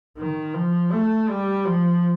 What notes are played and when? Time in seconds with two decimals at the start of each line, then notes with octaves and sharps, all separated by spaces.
0.18 D#3
0.54 F3
0.92 A3
1.29 G3
1.66 F3